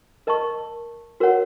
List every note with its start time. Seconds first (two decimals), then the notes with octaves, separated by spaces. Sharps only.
0.27 A#4 D#5 A5 C#6
1.20 F#4 A#4 C#5 F#5